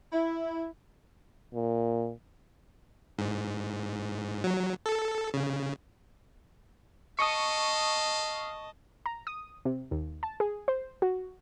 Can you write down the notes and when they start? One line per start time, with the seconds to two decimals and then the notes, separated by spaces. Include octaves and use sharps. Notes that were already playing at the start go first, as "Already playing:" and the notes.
0.12 E4
1.54 A#2
3.18 G#2
4.44 F#3
4.86 A4
5.34 C#3
7.19 D#5 F5 A5 C#6 D#6
9.06 A#5
9.27 D#6
9.65 C3
9.91 D#2
10.23 A5
10.40 G#4
10.68 C5
11.02 F#4